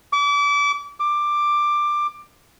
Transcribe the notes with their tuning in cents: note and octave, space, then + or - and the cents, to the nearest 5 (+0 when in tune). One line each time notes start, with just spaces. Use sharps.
D6 -35
D6 +10